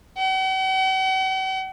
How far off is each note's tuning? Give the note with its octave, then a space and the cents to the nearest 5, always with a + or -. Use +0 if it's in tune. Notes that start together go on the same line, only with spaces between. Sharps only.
F#5 +45